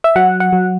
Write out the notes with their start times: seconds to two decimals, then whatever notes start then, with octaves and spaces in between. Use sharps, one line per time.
0.04 E5
0.16 F#3 F#5
0.40 F#5
0.52 F#3